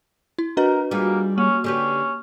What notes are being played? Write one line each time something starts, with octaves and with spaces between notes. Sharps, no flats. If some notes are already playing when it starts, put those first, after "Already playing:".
E4
D4 F#4 A#4 B4 D#5
G3 A#3 F4 G#4
A#3 C#4
D3 C#4 G4 B4